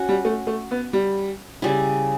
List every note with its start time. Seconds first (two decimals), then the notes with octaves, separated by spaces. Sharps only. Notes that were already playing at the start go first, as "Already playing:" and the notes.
Already playing: C#4 F#4 C#5
0.09 G3
0.25 A3
0.47 A3
0.71 B3
0.93 G3
1.62 C#3 G3 C#4 E4